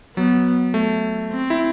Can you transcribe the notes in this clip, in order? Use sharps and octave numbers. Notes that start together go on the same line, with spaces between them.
F#3 B3
A3
C4
E4